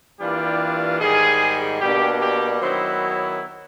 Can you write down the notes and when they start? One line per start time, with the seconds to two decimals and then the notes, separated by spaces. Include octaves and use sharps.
0.20 E3 G3 A#3 D4 F4 G4
1.00 G#2 D#3 G3 G#4
1.81 B2 G3 A#3 D4 G4
2.21 G4
2.61 D#3 F#3 B3 E4 C5
3.01 C#5